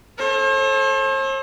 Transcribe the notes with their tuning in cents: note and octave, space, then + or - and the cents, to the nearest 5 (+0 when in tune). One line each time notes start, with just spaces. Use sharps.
A4 -20 C5 +45